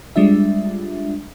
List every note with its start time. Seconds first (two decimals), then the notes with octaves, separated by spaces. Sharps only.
0.16 G3 G#3 D4 F4 E5